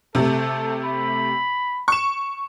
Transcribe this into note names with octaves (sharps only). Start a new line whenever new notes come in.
C3 A3 A4
B5
C#6 E7